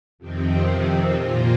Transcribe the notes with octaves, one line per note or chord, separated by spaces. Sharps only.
F2 C3 D#3 C4
A#2 A#3 F4